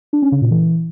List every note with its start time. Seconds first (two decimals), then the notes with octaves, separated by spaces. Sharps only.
0.13 D4
0.22 C#4
0.32 C#3
0.41 A#2
0.51 E3